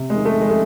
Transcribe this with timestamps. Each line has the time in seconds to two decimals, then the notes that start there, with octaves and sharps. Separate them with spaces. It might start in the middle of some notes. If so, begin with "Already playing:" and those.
Already playing: C3
0.10 G#3
0.15 D#3
0.25 A3
0.35 D#3
0.41 G#3
0.49 A3